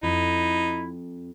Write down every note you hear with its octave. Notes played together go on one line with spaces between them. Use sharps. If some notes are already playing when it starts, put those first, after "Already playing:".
F2 D#4 E4